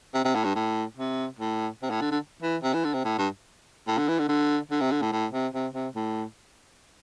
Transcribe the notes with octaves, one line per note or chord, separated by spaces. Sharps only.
C3
C3
A2
G2
A2
C3
A2
C3
A2
D3
D3
E3
C3
E3
D3
C3
A2
G2
A2
D3
E3
D3
D3
D3
C3
D3
A2
A2
C3
C3
C3
A2